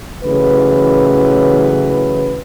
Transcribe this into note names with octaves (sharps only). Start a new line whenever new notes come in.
A1 C#3 E3 F#3 B4